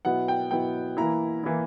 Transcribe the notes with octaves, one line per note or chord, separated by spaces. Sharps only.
B2 F#3 B3 E4 F#5
G5
B2 F#3 B3 E4 G5
E3 A#3 E4 A#5
E3 A#3 E4